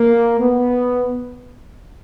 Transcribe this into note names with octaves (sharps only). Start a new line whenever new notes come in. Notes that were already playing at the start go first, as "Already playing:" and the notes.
Already playing: A#3
B3